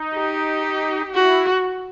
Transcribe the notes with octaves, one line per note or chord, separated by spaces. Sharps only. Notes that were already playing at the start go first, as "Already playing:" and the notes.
Already playing: D#4
G4
E4 F#4